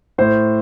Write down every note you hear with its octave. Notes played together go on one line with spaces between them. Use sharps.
A2 C5